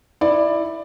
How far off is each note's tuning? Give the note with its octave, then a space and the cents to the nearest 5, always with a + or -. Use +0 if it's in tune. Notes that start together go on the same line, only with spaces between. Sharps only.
E4 +0 D5 +15